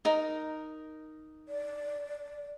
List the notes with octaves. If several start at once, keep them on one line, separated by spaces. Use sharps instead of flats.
D#4 A#4
D5